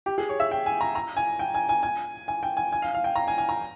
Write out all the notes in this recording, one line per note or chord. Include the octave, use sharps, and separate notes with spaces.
G4
G#4
C#5
E5
G5
G#5
A#5
A#5
G#5
G5
G#5
G#5
G#5
G#5
G5
G#5
G#5
F5
F5
G5
A#5
G#5
G#5
A#5